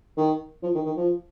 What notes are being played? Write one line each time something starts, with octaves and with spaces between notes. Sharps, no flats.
D#3
F3
D#3
D#3
F3